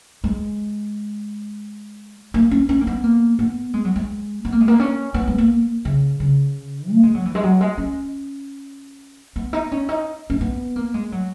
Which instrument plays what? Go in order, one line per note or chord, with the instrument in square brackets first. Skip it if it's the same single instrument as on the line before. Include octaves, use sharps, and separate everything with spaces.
[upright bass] G#3
A#3
C#4
C#4
A#3
B3
A#3
B3
G#3
F#3
G#3
B3
A#3
G#3
A#3
C#4
B3
G#3
A#3
C#3
C#3
A#3
G#3
F#3
E3
G#3
F#3
G#3
C#4
B3
D#4
C#4
D#4
C#4
B3
A#3
G#3
F#3